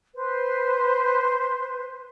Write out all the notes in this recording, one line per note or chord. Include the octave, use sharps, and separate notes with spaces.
B4 C5